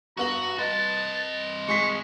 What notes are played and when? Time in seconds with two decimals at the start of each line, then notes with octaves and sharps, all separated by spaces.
0.17 G2 B3 F#4 A#5 F#7
0.58 C4 B4 D#5 A5
1.68 G#3 G#4 C#6 B6